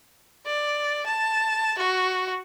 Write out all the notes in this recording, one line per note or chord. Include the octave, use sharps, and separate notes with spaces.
D5
A5
F#4